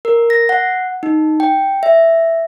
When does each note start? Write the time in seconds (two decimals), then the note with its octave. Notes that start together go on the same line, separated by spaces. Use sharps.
0.05 A#4
0.30 A#6
0.49 F#5
1.03 D#4
1.40 G5
1.83 E5